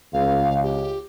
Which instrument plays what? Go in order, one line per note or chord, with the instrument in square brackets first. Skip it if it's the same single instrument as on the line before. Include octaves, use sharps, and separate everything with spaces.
[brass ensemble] C#2 [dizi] F5
[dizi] G4